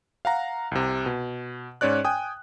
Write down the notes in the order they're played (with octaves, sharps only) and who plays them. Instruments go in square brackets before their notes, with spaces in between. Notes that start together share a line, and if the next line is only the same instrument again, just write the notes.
[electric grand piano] F5 F#5 A#5
C2 C3
B2
G#2 C#4 C#5 D5 F#6
G5 G#5 D#6